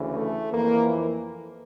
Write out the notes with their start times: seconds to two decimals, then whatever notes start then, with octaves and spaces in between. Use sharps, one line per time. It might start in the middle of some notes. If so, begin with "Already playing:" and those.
Already playing: D2 C#3 E3
0.13 A3
0.52 F2 E3 A#3